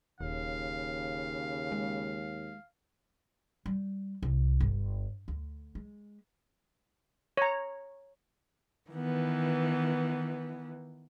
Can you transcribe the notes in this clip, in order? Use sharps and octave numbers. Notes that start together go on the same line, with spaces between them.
D#1 D#2 C#3 F5
G#3
G3
C2
G1
D2
G#3
C#5 A#5
D#3 E3 B3